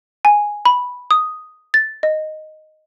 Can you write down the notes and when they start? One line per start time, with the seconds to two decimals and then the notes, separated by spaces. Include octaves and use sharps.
0.25 G#5
0.65 B5
1.11 D#6
1.74 A6
2.03 D#5